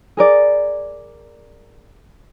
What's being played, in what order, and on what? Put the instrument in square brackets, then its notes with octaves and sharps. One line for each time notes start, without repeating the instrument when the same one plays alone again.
[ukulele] G#4 A#4 D5